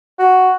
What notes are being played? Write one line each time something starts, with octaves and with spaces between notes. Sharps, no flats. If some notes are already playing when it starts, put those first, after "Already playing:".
F#4